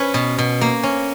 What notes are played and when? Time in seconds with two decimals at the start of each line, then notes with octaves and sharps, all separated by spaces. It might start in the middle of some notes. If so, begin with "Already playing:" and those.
Already playing: C#4 B4 C#5
0.14 B2
0.38 B2
0.61 A#3
0.83 C#4